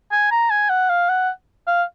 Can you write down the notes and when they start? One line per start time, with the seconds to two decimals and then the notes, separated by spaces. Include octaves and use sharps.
0.12 G#5
0.31 A#5
0.50 G#5
0.70 F#5
0.90 F5
1.09 F#5
1.67 F5